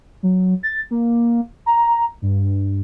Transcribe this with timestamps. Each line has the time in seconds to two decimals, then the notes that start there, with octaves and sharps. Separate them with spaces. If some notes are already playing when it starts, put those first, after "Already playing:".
0.23 F#3
0.63 A6
0.91 A#3
1.66 A#5
2.22 G2